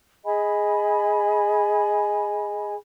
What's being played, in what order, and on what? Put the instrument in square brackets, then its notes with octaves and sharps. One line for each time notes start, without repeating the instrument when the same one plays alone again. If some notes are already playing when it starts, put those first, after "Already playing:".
[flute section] G#4 D#5 G#5 B5